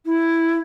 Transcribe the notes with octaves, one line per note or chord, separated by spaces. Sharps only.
E4